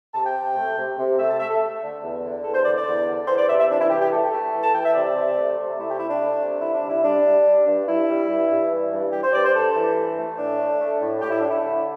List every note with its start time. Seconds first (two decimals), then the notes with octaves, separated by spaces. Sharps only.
0.14 C3 A5
0.24 G5
0.35 C3
0.55 A3
0.77 C3
0.97 C3
1.18 A3 E5
1.29 A5
1.39 A3 E5
1.50 A4
1.60 A3
1.81 D3
2.02 E2
2.22 D3
2.43 E2 A4
2.54 C5
2.64 D3 D5
2.75 D5
2.86 E2
3.07 D3
3.27 E3 C5
3.37 D5
3.48 C3 E5
3.58 E5
3.69 E3 D4
3.80 E4
3.90 E3 G4
4.00 G4
4.11 A3 A4
4.32 A3
4.53 E3
4.62 A5
4.73 E3 G5
4.84 E5
4.94 C3 D5
5.15 C3
5.36 A3
5.57 C3
5.78 A3 E4
5.88 G4
5.99 A3 E4
6.10 D4
6.20 A3
6.41 C3
6.61 D3 E4
6.75 D4
6.82 G3
6.89 E4
7.03 G3 D4
7.25 G3
7.45 G3
7.66 G2
7.87 G2 E4
8.08 G3
8.29 G2
8.49 G2
8.71 E3
8.91 G2
9.12 G2 G4
9.22 C5
9.33 G2 D5
9.44 C5
9.54 G2 A4
9.75 E3
9.96 A3
10.17 A3
10.38 A2 D4
10.58 A3
10.79 A3
11.00 A2
11.21 A2 G4
11.31 E4
11.40 A3 D4
11.50 E4
11.63 D3